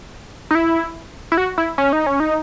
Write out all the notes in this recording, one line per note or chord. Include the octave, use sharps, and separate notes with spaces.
D#4
E4
E4
F#4
E4
C#4
D#4
C#4
D#4